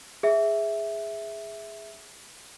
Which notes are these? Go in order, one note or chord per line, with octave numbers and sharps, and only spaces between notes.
G#4 E5